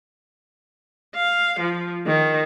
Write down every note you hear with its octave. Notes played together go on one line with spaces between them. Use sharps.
F5
F3
D#3